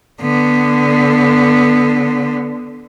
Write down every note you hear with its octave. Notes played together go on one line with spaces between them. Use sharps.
D3 B3